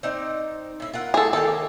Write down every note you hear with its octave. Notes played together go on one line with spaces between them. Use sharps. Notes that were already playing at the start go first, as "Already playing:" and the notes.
C4 D#4 D5
A2 E4
F4 A#4 F#5
G#4 A4
D#3 A#3 G4 A4